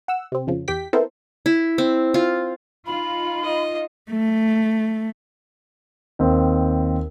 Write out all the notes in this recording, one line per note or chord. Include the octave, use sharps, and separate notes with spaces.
F#5 E6
C3 C4
F2 C#3 F3
E2 G4 G5 B6
B3 C4 E4 A4 A#4 C5
E4
C4
F4
D#4 F4 B5
D#5
A3
D#2 C4